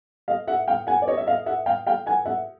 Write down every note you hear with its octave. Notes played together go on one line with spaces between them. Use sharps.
D#5 F5
E5 F#5
F5 G5
F#5 G#5
D5
C#5 D#5
E5
D#5 F5
E5 F#5
F5 G5
F5 G5
F#5 G#5
E5 F#5